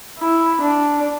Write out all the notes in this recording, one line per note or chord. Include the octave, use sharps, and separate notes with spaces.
E4
D4